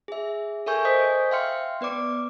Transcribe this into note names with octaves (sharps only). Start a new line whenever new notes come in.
G#4 E5
A4 A#4 E5 G#5 C#6 G6
C5 D#5 G#5 D#6 G6 B6
E5 F5 G5 C6 F6 C#7
B3 B4 D5 D6